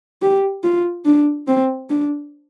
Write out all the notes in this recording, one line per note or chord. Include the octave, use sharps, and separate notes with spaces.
G4
F4
D4
C4
D4